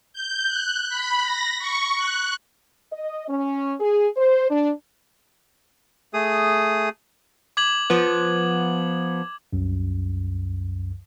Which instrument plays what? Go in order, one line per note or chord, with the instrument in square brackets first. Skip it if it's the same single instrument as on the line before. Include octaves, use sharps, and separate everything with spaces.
[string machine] G6
F#6
B5
A#6
C#6
F#6
[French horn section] D#5
C#4
G#4
C5
D4
[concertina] A3 G#4 D#6
[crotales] D6 G#6 F#7
[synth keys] F3 B3
[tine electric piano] C2 F#2